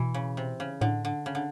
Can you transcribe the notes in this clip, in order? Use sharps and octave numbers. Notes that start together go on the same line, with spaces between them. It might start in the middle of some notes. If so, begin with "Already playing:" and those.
Already playing: B2 E3
C#3
C3
C#3
A2 D3
D3
C#3
D3